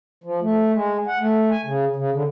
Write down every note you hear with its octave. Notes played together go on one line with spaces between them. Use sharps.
F3
A3
G#3
F#5
A3
G#5
C#3
C#3
D3